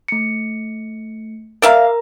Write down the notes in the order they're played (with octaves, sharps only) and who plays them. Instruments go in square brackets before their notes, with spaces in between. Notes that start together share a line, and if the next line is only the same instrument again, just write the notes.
[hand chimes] A3 C#7
[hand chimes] A#4 A#5 [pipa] D5 E5 F5